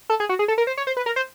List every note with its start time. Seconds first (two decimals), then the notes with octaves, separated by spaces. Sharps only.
0.10 A4
0.20 G#4
0.29 F#4
0.39 G#4
0.48 A4
0.58 A#4
0.67 C5
0.77 C#5
0.87 C5
0.97 B4
1.06 A#4
1.16 C5